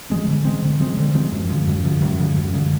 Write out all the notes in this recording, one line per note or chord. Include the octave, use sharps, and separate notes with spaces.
F3 G#3 C4
D3
F3 G#3 C4
D3
F3 G#3 C4
D3
F3 G#3 C4
F#2
D3 F3 G#3
F#2
D3 F3 G#3
F#2
D3 F3 G#3
F#2
D3 F3 G#3